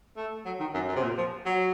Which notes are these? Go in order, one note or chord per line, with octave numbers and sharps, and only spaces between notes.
A3
F#3
D#3
F#2
F#2
C3
A#2
F3
F#3